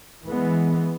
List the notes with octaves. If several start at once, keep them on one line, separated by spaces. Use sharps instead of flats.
E3 G#3 B3